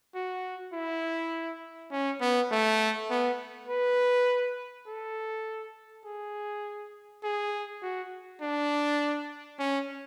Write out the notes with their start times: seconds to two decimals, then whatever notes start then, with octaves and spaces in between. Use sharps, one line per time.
0.15 F#4
0.73 E4
1.91 C#4
2.21 B3
2.51 A3
3.10 B3
3.68 B4
4.87 A4
6.05 G#4
7.23 G#4
7.82 F#4
8.41 D4
9.59 C#4